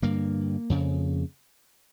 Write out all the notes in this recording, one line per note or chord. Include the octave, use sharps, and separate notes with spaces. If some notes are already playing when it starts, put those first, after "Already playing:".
G2 D3 A#3
F2 C#3